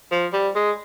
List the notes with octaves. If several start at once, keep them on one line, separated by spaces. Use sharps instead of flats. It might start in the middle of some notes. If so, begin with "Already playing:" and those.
F3
G3
G#3